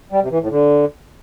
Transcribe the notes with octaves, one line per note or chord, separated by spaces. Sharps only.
G3
C3
E3
A2
D3